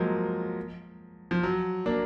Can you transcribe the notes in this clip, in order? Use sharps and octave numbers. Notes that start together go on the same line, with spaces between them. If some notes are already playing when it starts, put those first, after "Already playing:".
Already playing: F3 F#3 G#3 A#3
F3
F#3
A#3 D4